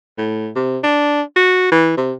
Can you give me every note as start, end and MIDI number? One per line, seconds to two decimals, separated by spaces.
0.18 0.49 45
0.55 0.78 48
0.83 1.22 62
1.36 1.69 66
1.72 1.94 52
1.97 2.13 48